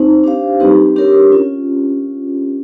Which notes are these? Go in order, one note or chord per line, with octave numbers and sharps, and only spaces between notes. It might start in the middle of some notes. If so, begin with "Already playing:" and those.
Already playing: C4 D#4 C5
D4 G4 C5 F5
G3 C4 D#4 G4 B4
D4 G4 A#4 C#5
C#4 F4